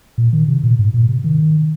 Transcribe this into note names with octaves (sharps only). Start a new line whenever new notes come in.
A#2
D#3
C3
A#2
G#2
A#2
C3
D#3